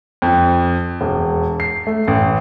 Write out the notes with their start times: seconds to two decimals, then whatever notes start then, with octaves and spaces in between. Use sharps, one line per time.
0.22 F2
1.01 E1
1.60 C7
1.87 A3
2.08 A1